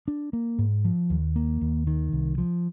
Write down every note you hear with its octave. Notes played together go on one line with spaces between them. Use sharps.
D4
A#3
G#2
F3
D#2
A#3
D#2
D#3
C2
F3